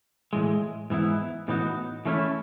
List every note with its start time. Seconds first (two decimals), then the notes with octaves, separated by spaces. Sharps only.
0.33 A2 E3 G#3
0.90 G#2 E3 B3 E4
1.48 A2 E3 B3 D#4 F#4
2.05 E3 A3 C#4 E4